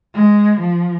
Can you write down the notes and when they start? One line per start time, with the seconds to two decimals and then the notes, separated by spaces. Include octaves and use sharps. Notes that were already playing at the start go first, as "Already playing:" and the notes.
0.15 G#3
0.61 F3